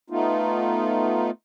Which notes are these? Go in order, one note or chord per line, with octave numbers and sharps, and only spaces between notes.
A3 B3 D#4 F4